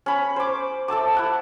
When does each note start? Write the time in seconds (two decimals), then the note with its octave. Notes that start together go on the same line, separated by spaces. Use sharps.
0.06 C#4 B5
0.36 C5 D6
0.88 A4 E5 A5 D6
1.15 E4 F#5 A5